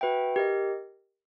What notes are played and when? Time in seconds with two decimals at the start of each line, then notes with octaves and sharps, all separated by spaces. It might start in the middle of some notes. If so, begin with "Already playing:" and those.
0.01 F#4 B4 E5 G5
0.36 G4 A#4 D#5